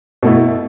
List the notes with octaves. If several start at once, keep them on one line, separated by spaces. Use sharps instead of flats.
B2 A3 E4